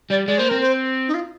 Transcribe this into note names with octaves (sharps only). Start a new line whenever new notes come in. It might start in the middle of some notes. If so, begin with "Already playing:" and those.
G3 D5
G#3 D5
A#3 C5
C4 A#4
C5
D#4
F4